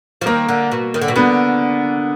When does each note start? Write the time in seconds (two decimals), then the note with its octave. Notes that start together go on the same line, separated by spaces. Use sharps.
0.21 F3
0.26 D#3 A#3
0.49 D3
0.72 B2
0.94 D#3
1.01 D3
1.08 B2
1.16 D3 B3